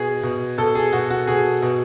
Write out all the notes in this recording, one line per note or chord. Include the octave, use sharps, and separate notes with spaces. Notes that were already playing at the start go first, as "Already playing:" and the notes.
Already playing: B2 G#4
B2
B2 A4
G#4
B2 F#4
F#4
B2 G#4
B2